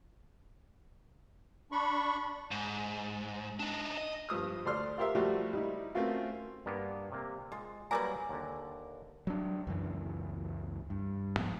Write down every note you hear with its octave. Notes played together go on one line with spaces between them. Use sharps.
D4 B5 C#6
G#2
D4 D#4
D#5
G2 F3 D#6 F6
D2 A4 C5 D5 C6 F6
F4 G4 A#4 C5 E5
F3 G3 A3 A#3 F#4 G4
G3 D#4 E4
A3 A#3 C4 C#4 F4 F#4
G2 A#3 B3
C3 A#3
G#3 F4
F#3 G3 A#3 B4 D5 G#5 A#5
D#2 D3
F#3 D4
C#2 F#2 E3
G2
G#2 F3 B3